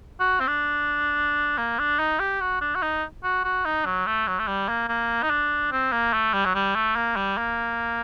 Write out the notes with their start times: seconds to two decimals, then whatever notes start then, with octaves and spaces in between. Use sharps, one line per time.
0.20 F#4
0.40 C4
0.48 D4
1.58 A#3
1.79 D4
1.99 D#4
2.20 G4
2.41 F#4
2.61 D4
2.75 F#4
2.82 D#4
3.24 F#4
3.44 F#4
3.65 D#4
3.86 F#3
4.07 A3
4.27 F#3
4.39 A3
4.48 G3
4.69 A#3
4.89 A#3
5.23 D#4
5.30 D4
5.72 C4
5.92 A#3
6.13 A3
6.34 G3
6.45 F#3
6.55 G3
6.75 A3
6.96 A#3
7.17 G3
7.38 A#3